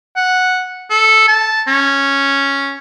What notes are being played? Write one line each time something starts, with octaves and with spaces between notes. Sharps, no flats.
F#5
A4
A5
C#4